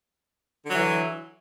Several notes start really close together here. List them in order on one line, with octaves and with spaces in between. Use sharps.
D3 F#3 E3